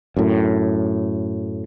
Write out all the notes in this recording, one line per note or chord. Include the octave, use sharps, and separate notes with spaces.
F#2 A2